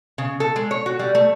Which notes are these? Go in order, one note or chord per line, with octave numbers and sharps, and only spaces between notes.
C#3
A4
G#3
C#5
F#4
G3
A3